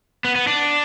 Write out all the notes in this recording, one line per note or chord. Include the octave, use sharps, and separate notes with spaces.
B3
B3
D4